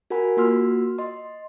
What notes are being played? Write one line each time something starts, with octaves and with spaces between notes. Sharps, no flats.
F#4 A#4 F#5 G#5 B5
A#3 F4 F#4 C6 E6 F6
D#5 C6